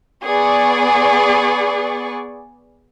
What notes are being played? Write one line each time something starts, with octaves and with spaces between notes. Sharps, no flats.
B3 G#4 D5 C#6